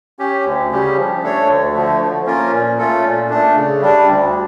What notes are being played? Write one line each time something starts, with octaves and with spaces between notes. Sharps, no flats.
C#4 G4
D2
C#3 G3 C#4 G4
F3
A3 D4 A4 C#5
D2
D3 F3 A3
F3
A#3 C#4 F4 A#4
A#2
A3 C#4 F4 A4
A#2
A3 D4
C#3
G3 D4
D2